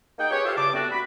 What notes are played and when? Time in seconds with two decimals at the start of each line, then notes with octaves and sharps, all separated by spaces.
0.19 A#3 D#4 G#4 F#5 G5
0.31 G4 G#4 B4 C#5
0.45 F4 G4 A4 C5 E5 F5
0.57 E2 G2 C#3 A5 D6
0.73 G3 A3 B3 C4 D4 F#4
0.92 F#4 B5